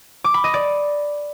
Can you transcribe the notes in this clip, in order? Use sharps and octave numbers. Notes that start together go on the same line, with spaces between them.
D6
B5
D#5
D5